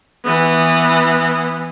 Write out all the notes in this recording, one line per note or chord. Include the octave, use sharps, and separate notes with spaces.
E3 B3